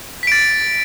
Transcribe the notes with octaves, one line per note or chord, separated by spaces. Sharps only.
A6 B6 D7